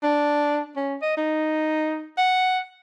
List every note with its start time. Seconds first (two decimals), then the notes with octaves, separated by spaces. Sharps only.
0.03 D4
0.76 C#4
1.02 D#5
1.17 D#4
2.18 F#5